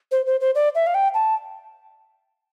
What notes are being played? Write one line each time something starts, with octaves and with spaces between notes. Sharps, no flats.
C5
C5
C5
D5
E5
F5
G5
A5